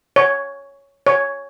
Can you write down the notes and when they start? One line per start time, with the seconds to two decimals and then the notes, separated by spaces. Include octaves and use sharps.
0.16 C#5
1.07 C#5